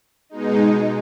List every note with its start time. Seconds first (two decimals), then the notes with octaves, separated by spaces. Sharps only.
0.29 B2 G#3 D#4